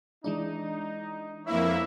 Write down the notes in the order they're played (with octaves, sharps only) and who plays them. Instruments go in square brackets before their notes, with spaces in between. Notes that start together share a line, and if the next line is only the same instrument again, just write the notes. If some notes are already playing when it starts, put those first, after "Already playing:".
[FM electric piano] E3 G#3 D4 [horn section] D#4
[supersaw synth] F2 A#3 E4 [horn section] B4 C#5 E5